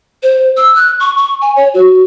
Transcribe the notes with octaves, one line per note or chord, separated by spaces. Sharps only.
C5
E6
F#6
C#6
C#6
G#5
C#5
F#4